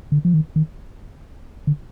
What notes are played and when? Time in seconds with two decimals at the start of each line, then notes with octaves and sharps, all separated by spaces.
0.12 D3
0.25 F3
0.34 D#3
0.56 D#3
1.67 D3